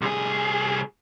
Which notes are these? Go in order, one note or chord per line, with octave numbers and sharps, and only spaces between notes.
C2 G#4